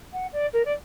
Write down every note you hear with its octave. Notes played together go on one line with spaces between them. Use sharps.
F#5
D5
A#4
D5